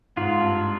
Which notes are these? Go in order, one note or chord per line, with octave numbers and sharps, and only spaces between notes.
G#2 F4
G2